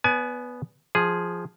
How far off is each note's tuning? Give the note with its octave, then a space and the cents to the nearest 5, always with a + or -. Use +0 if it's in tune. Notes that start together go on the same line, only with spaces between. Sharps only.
B3 +0 D5 -30 G#5 +30
F3 +0 G#4 +0